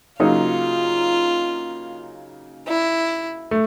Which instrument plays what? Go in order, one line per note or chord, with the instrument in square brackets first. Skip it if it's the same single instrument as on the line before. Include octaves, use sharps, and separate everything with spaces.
[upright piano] C#3 F#3 A#3 D#4 [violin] F4
[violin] E4
[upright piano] A3